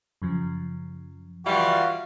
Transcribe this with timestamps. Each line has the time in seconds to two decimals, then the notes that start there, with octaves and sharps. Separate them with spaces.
0.22 F#2 C#3 F3
1.46 E3 G3 F4 F#4 F5